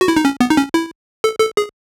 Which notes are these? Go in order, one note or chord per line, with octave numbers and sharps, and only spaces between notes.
F#4
E4
D#4
C#4
B3
D#4
C#4
E4
A4
A4
G#4